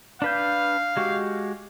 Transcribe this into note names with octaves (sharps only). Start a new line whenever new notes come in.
D4 B4 F5 G6
G#3 F#4 G4